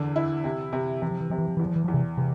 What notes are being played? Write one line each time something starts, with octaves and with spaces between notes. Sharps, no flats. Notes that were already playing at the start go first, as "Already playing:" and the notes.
Already playing: E2 D3
E4
C3
C3
C3 E3
F3
E3
C3 F3
E3
F3
E2 E3
F3
E3
E2 F3
C3 E3
C3 E3